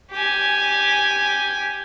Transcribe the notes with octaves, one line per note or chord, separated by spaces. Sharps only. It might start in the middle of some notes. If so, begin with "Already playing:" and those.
G4 G#5